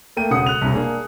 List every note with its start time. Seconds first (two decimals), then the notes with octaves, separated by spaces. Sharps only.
0.17 A3 A#3 G5 D#7
0.31 E1 C#3 A4 F#5 D#6 C#7
0.46 F#6 F7
0.62 E1 C2
0.74 A#3 D4 G#4